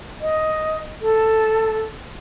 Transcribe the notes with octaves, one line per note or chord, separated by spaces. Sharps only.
D#5
A4